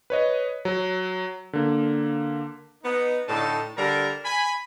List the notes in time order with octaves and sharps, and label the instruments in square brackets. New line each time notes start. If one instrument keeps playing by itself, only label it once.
[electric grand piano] B4 C#5 D#5
F#3
D3 A#3
[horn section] B3 D#4
A2 D3 D#4 G5 A5
D3 G3 A#4 A5 A#5
G#5 B5